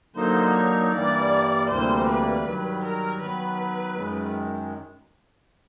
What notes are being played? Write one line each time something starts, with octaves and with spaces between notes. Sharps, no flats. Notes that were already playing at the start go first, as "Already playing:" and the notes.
D3 F#3 A#3 D#4 C5
C#5
G2 E3 G3 A#3 D5
D2 C3 E3 G3 A#3 C5
B4
G2 D#3 F#3
A#4
D#3 F#3 B3 B4
F#2 D#3 G#3